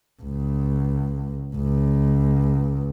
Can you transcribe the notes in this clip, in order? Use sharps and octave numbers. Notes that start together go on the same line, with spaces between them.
C#2
C#2